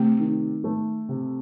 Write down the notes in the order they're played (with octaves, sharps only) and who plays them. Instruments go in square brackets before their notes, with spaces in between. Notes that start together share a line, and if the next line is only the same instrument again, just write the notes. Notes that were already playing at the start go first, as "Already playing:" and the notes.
Already playing: [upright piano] C3 [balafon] A3
[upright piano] D#3
A3
C3